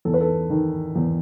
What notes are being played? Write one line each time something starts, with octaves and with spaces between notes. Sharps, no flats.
E2 A4
B4
A4
D#3
E2